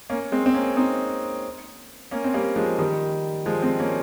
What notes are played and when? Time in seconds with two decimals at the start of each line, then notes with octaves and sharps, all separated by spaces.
0.10 A#3 C#4
0.32 G#3 C4
0.46 C4
0.54 A#3 C#4
0.77 C4 D#4
2.11 A#3 C#4
2.24 C4
2.34 G3 A#3
2.56 F3 G#3
2.79 D#3 G3
3.46 F3 G#3
3.62 G#3 C4
3.80 A#3 C#4